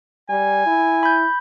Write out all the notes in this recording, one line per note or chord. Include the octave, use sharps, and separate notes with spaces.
G3 G#5
E4
B5 G6